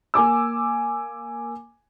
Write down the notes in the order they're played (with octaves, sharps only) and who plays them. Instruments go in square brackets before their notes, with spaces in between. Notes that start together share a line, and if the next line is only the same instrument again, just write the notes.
[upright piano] A#3 G#5 D6 E6